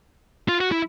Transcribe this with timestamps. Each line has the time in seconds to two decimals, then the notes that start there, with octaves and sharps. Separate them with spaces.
0.49 F4
0.61 F#4
0.72 E4